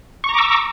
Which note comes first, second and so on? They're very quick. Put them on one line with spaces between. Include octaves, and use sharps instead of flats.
C#6 A#5 D6 E6